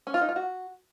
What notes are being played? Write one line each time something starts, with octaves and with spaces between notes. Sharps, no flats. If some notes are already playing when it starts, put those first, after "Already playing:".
C#4
F4
D#4
F4
F#4